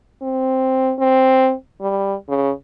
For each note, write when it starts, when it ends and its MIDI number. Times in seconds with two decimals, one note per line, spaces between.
0.22 0.94 60
0.99 1.54 60
1.81 2.15 55
2.29 2.51 49